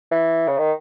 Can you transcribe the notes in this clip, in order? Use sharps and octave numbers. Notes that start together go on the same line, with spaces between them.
E3
C#3
D#3